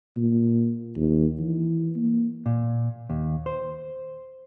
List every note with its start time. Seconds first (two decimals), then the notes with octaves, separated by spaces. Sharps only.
0.17 A#2
0.96 D#2
1.39 E3
1.96 A#3
2.46 A#2
3.10 D#2
3.46 C5